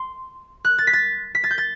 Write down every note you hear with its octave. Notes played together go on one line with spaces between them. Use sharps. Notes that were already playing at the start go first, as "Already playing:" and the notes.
Already playing: C6
F#6
A6
B6
A6
B6
A6
G6
A6